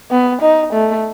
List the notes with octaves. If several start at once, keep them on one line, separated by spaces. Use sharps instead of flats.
B3
D#4
A3